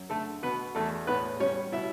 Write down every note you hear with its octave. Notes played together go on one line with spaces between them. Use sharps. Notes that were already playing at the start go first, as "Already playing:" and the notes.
Already playing: F#2
D3 A3 A4
B2 B3 B4
E2 A3 A4
A2 B3 B4
G3 C#4 C#5
B2 E4 E5